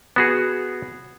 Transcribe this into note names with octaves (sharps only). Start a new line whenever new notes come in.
B3 F#4 G#4